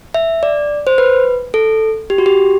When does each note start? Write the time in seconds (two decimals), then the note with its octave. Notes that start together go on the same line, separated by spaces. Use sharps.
0.14 E5
0.43 D5
0.87 C5
0.98 B4
1.54 A4
2.10 G4
2.18 F#4
2.26 G4